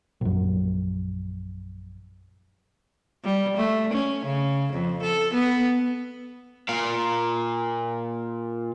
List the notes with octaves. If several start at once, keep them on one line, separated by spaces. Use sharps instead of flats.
A#1 F#2
G3
A3
C#4
C#3
F2
A4
B3
A#2 F5